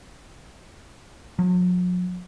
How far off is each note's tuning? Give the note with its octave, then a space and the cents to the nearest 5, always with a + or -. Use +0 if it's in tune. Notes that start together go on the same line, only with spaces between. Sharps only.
F#3 -45